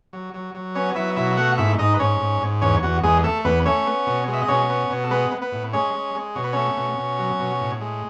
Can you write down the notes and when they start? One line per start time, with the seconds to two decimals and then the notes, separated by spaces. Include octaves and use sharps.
0.13 F#3
0.34 F#3
0.54 F#3
0.75 B3 C#4 C#5
0.95 F#3 E4 E5
1.16 B2 E4 E5
1.31 E5
1.37 A3 F#4 F#5
1.58 G#2 E4 E5
1.79 G#2 D#4 D#5
1.94 B4
1.99 G#2 C#4 C#5
2.20 G#2
2.41 G#2
2.61 E2 C#4 C#5
2.83 E2 F#4
3.04 E2 G#3 G#4
3.24 A3 A4
3.45 E2 B3 B4
3.65 A3 C#4 C#5
3.86 B3
4.07 B2
4.28 G#3
4.33 E5
4.41 D#5
4.48 B2 C#4 C#5
4.69 B3
4.90 B2
5.04 A4
5.11 G#3 B3 B4
5.31 B3
5.41 B3 B4
5.52 A2
5.73 G#3 C#4 C#5
5.94 G#3
6.15 G#3
6.35 B2 C#5
6.44 B4
6.53 A3 C#4 C#5
6.77 B2
6.97 B2
7.19 F#3
7.40 B2
7.60 A2
7.81 G#3